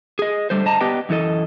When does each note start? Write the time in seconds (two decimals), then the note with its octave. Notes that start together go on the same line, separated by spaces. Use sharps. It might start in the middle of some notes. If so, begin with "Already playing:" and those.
0.19 G#4 D#5
0.50 D3 G3 A3 C5
0.65 G2 D#5 A5 A#5
0.80 B3 G4 B4 D5 D#5 G5
1.09 F#2 E3 E4 A4 D#5